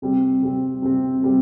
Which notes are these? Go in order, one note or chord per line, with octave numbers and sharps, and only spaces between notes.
C3 G3 C4
C3 G3 C4
C3 G3 C4
C3 G3 C4